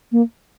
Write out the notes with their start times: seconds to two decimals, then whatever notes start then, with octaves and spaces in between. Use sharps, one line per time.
0.12 A#3